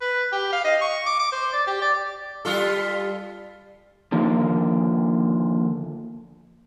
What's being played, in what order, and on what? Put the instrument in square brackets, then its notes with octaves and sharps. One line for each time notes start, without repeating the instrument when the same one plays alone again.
[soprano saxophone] B4
G4
F5
D#5
C#6
D6
D6
C5
D5
G4
D5
[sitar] G3 F4 A4
[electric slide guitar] D3 D#3 F3 A#3